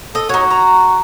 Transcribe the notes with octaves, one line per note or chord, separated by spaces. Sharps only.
A4 D#5
C#4 D#4 F#4
A#5